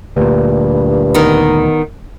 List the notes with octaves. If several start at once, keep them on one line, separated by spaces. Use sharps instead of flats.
D2 G2 A#2
D#3 B3 D#4